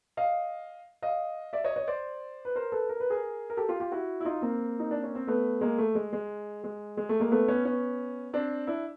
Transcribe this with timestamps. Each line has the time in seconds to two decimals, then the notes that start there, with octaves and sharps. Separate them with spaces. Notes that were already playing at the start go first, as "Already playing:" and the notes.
0.17 D#5 F5
1.02 D#5 F5
1.53 D5 E5
1.64 C#5 D#5
1.76 C#5 D#5
1.88 C5 D5
2.45 B4
2.55 A#4 C5
2.72 A4 B4
2.89 A#4
3.00 B4
3.10 G#4 A#4
3.50 A#4
3.57 G4 A4
3.69 F4 G4
3.80 F4 G4
3.92 E4 F#4
4.20 E4
4.25 D#4 F4
4.42 A#3 C4
4.80 D#4
4.91 D4
5.03 C#4
5.15 C4
5.27 A3 B3
5.61 G#3 A#3
5.78 A3
5.95 G#3
6.13 G#3
6.64 G#3
6.97 G#3
7.09 A3
7.20 G#3 A#3
7.31 A3 B3
7.48 B3 C#4
7.65 B3 C#4
8.33 C4 D4
8.67 D4 E4